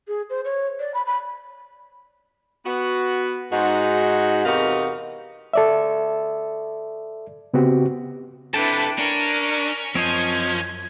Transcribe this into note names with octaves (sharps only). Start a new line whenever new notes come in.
G#4
C5
C#5
D5
B5
B5
B3 F#4
G#2 D#4 F#4
E2 C3 D#4 F#4 A#4 F5
A4 D5 E5
C#3 B3 C4 F#4 G4
F2 C3 D4 E4 A4 B4 G5 A5
C#4 D4 A#4
F#2 F3 C4 C#5 D#5 G#6